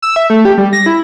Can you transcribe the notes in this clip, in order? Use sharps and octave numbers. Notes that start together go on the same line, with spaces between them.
E6
E5
A3
G4
G3
A#6
E4